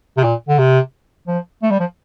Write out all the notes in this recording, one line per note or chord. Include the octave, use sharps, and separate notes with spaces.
C3
A#2
D3
C3
F3
A3
G3
F3